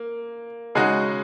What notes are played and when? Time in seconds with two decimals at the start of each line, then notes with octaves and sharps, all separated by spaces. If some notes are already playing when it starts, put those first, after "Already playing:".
Already playing: A#3
0.75 C#3 G#3 D#4 F#4 D#5